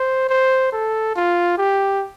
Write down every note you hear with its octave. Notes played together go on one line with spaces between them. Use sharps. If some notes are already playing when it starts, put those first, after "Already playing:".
Already playing: C5
C5
A4
F4
G4